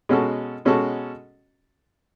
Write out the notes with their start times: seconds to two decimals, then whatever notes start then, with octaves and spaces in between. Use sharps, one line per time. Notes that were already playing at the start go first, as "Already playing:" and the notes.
0.09 B2 G#3 C#4 F#4 A4
0.65 B2 G#3 C#4 F#4 A4